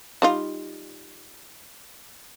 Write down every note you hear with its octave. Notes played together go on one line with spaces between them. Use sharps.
G3 D#4 F4